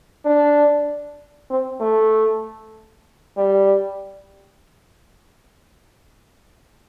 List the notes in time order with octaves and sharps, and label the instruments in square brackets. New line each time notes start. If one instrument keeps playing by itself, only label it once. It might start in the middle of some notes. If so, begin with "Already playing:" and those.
[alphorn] D4
C4
A3
G3